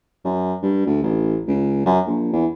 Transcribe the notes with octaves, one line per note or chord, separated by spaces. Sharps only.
F#2
G2
D2
A1
C#2
F#2
A#1
E2